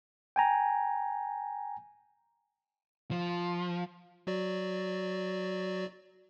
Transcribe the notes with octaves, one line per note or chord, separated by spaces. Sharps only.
G5 G#5 A#5
F3
F#3 F#4 D5